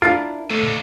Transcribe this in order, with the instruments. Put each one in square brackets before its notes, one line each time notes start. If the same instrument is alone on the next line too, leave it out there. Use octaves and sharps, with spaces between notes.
[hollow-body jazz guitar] D4 E4 A#4 [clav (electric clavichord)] F4
[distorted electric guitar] D#2 D3 [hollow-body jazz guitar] A3